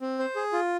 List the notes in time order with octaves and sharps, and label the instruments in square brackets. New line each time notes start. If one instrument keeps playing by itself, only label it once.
[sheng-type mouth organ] C4
C5
G#4
F4